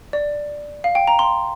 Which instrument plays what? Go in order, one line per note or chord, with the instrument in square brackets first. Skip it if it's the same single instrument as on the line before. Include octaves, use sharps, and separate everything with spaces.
[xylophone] D5
F5
G5
A#5
C6